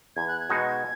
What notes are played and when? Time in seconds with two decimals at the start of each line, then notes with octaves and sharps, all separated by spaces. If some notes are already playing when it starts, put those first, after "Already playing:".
0.16 E2 G#6
0.28 F#6
0.40 G#6
0.50 B2 G#3 D#4 F#4